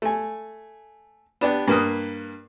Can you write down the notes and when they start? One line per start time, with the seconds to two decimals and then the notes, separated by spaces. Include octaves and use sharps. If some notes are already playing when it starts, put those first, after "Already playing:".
0.02 A3 G#5
1.41 B3 D4 G4
1.68 G2 A#3 B4 D#6